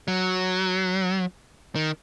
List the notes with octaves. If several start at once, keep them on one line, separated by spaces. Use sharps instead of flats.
F#3
D#3